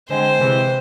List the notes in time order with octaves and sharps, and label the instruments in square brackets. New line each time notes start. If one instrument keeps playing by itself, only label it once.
[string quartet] D3 G#3 C4 [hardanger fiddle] C5
[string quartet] C3 E3 G#3